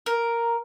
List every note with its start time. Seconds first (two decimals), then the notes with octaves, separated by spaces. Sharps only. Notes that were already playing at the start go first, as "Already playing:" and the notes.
0.06 A#4